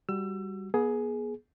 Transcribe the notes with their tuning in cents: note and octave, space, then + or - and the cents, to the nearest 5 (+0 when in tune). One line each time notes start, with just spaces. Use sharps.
G3 +0 F#4 +0 E6 +30
B3 -35 G#4 +15